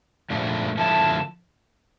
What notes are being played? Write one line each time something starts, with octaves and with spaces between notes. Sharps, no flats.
A#2 F3 A3 D4
D3 F3 A#3 E4 A4 A5